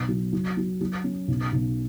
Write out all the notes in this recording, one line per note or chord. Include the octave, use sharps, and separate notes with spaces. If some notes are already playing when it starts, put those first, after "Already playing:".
Already playing: B1
F#3
F#3
F#3
F#3
C#4
B1
B1